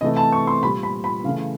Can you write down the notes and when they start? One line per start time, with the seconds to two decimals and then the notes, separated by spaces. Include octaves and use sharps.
0.01 C3 E3 A3 D#5
0.16 A5
0.32 C#6
0.47 C6
0.62 A#2 G3 B5
0.83 B5
1.04 B5
1.24 C#3 E3 A3 F5